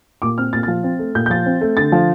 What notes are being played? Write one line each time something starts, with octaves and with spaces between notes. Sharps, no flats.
A#2 D6
C4 F6
A#2 A6
A6
F3
C4
A3
A#2 G6
G6
F3 A6
C4
A3
D3 A6
F3